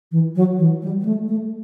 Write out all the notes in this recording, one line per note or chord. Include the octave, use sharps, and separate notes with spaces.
E3
F#3
E3
G3
G3
A3
A3